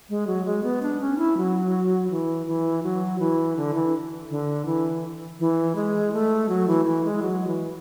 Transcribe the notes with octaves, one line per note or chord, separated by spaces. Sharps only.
G#3
F#3
G#3
B3
D4
C#4
E4
F#3
E3
E3
F#3
E3
D3
E3
D3
E3
E3
G#3
A3
F#3
E3
E3
G#3
F#3
E3